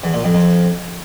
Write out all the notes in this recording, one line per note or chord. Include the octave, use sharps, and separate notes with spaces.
E2
A#2
F2
F2